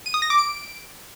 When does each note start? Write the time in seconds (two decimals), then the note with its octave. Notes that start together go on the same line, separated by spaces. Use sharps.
0.06 D#7
0.14 D#6
0.22 A#6
0.30 D6
0.38 D7